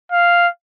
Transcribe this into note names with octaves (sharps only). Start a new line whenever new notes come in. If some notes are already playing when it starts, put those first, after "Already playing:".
F5